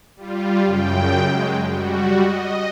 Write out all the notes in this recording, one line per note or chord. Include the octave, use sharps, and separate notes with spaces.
G3 F4
F#2 C#3 G5
F#3 G#3
G3 F#4
D#5